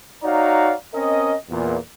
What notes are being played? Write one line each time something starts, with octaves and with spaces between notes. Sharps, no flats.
D#4 F#4 C#5 D5 F5 A#5
C4 C#4 A#4 D#5
E2 A#2